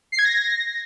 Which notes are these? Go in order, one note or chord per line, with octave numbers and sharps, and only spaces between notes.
C7
G#6
A#6